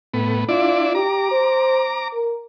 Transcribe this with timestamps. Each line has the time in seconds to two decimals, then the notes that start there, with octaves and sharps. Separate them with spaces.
0.14 A2 B3
0.49 D4 E4 F4 D5
0.95 G4 A#5 D6
1.31 C5
2.13 A#4